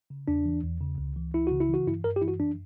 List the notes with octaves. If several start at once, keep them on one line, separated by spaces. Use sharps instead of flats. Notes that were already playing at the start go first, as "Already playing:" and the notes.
C#3
E2 D4
E3
E2
C#3
C#2
E3
C#2 E4
C#3 F#4
E4
E3 F#4
G2 E4
G2 A#4
G4
E3 E4
F#4
F#2 D4